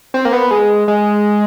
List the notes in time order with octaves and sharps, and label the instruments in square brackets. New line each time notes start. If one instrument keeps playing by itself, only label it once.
[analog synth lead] C4
A#3
B3
G#3
G#3